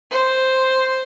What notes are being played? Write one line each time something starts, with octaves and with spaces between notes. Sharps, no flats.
C5